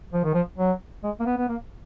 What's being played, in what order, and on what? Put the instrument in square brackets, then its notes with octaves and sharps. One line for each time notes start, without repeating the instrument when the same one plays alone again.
[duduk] F3
D#3
F3
F#3
G#3
A#3
B3
B3
A#3